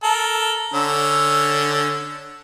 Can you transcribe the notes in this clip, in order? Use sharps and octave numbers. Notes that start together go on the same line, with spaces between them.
A4 A#4
D3 C#4 E6